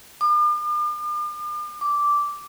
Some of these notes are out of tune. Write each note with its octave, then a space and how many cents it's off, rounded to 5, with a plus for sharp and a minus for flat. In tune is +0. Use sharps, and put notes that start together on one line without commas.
D6 +45
D6 -10